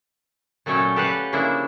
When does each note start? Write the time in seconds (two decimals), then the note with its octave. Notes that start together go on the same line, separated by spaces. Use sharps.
0.66 A#2 F#3 A3 C#4 A4 G5
0.96 G4 A4 B4 F5 F#5
1.33 C#3 F3 A#3 D4 E4